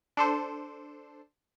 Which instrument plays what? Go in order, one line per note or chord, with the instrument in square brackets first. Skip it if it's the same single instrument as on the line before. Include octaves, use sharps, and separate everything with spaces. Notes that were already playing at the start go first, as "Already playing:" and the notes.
[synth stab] D4 A4 C5